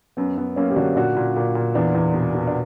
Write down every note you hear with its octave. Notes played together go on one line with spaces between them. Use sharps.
F#2 B3
F#2 B3
F#2 A#3 C#4
G4
D3 D4 F#4
A#2 D4 F#4
A#2
A#2
A#2
E2 B3 D4
E2
B2
B2
D4